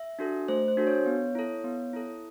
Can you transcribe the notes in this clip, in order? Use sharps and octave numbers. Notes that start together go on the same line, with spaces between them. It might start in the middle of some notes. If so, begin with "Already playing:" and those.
Already playing: E5
D4 F#4 A4
A3 C5
C5
D4 F#4 A4
C#5
B3
E4 A4
B3
E4 A4